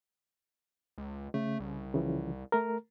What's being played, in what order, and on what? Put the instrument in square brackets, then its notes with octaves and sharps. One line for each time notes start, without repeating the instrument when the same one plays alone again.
[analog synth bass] C#2
[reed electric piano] C#3 [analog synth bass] A3
[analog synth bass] C2
[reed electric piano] C#3 E3 F3
A3 A#4